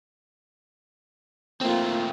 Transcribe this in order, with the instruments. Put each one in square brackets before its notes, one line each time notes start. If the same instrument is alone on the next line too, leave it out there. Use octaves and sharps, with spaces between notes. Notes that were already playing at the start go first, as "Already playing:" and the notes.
[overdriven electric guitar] A3 C4 [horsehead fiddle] A#3 F4